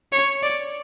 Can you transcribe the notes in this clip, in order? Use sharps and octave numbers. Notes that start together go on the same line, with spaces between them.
C#5
D5